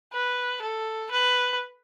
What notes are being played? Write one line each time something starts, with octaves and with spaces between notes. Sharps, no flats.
B4
A4
B4